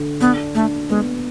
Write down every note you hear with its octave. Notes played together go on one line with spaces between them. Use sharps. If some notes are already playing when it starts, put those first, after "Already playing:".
Already playing: D3
B3 D4
A3 D4
G#3 B3